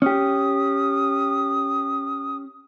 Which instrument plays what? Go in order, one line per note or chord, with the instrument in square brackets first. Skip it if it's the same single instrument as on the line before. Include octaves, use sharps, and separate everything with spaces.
[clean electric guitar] C#4 G4 [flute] D#6